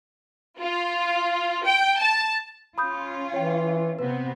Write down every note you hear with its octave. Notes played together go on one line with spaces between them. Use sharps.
F4
G5
A5
C#4 F4 B5 D#6 G6
E3 C#5 G5
C3 B3 C4 B4